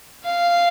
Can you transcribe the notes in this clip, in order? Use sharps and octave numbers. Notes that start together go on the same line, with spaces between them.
F5